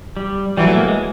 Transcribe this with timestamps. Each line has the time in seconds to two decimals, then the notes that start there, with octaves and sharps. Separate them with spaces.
0.17 G3
0.57 E3 F#3 G3
0.67 A3
0.77 A#3
0.88 G#3